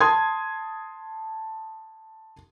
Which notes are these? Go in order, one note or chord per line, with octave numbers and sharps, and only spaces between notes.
A5 C6 D#6 G#6